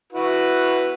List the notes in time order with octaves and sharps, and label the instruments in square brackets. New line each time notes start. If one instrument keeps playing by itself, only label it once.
[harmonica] E4 F#4 B4